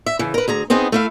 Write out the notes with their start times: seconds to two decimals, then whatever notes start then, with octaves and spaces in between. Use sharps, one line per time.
0.06 E5
0.19 C#3 E3
0.34 A#4 B4
0.48 D2 G#4 A#5
0.70 B3 C4 D#4 G#4
0.92 A3 E4 F5